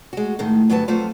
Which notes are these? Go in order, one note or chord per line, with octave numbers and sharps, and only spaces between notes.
G#3 F#4
A2 D#3 G#3
D2 G2 F#3 B3 B4 A5
F2 F#3 A3 F4 C5